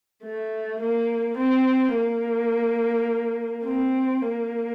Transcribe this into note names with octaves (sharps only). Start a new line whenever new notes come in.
A3
A#3
C4
A#3
C4
A#3